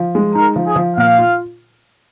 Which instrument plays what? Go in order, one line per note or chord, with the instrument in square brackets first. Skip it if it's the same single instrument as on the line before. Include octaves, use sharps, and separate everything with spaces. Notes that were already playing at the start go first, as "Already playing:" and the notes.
Already playing: [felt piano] F3
G#3
[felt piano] D#4 [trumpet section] A#4
[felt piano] F3
[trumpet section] G#4
[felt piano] F3
[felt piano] A#2 [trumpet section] F5
[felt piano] F4